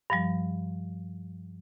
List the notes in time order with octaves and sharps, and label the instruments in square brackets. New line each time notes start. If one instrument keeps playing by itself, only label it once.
[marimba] G2 F3 G3